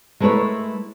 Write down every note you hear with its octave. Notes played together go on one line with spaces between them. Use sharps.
G#3 A3 E4 A#4 B4 C#5